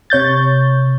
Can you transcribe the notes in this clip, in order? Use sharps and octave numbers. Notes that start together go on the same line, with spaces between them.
C3 C#5 G6 A6